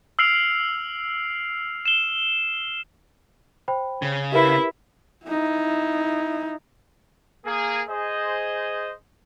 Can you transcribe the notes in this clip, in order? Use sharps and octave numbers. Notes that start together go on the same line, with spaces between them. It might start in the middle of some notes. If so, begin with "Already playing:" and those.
E6 F6 C7 D7 F7 F#7
E7 G7
C5 G5 B5
C#3
E4 G4 A#4 B4 E5
D#4 E4
A#3 G#4
G#4 C5 D#5